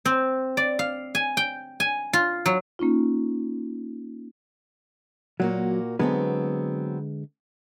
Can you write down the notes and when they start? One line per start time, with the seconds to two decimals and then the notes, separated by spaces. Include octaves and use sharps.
0.06 C4
0.57 D5
0.79 F5
1.15 G#5
1.37 G5
1.80 G#5
2.13 F4
2.46 F#3
2.79 A#3 C#4 D#4 F4
5.40 A#2 F#3 A#3 F#4
5.99 D3 F#3 G#3 B3 C4 B4